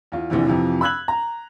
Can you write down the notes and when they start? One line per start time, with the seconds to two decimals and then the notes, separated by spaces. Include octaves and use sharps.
0.12 E2 F4
0.30 A#1 E2 C3 E3
0.45 F2 C3 E3 F3
0.81 B5 E6 F#6 G#6 F#7
1.08 A#5